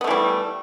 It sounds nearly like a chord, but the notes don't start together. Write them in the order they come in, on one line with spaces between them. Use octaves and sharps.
B3 A3 E3 G3